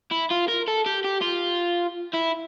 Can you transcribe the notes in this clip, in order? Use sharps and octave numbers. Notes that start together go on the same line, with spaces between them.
E4
F4
A#4
A4
G4
G4
F4
E4